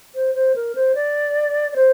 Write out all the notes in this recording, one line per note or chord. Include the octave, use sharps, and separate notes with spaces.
C5
C5
A#4
C5
D5
D5
C5